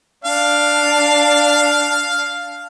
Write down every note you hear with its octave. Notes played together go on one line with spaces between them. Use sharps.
D4 F5